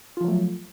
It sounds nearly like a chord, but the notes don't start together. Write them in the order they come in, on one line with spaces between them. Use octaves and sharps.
F4 F3 F#3 A3